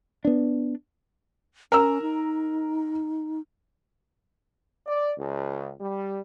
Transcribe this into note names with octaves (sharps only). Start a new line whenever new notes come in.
B3 D4
C#4 A#4 A#5 E6
D#4
D5
C#2
G3